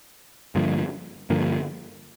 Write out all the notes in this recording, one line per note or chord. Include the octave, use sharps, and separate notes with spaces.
G2 D3 F3 A#3
G2 D3 F3 A#3